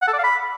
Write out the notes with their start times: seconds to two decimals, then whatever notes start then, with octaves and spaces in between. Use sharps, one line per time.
0.02 F#5
0.08 A4
0.13 D5
0.18 F5
0.24 B5